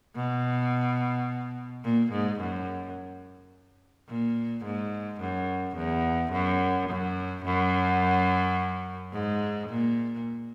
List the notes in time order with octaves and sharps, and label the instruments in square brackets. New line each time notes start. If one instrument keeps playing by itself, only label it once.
[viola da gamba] B2
A#2
G#2
F#2
A#2
G#2
F#2
E2
F#2
F#2
F#2
G#2
A#2